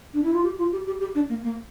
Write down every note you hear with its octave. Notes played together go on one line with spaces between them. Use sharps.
D4
E4
F4
G4
F4
G4
G4
G4
D4
A#3
A#3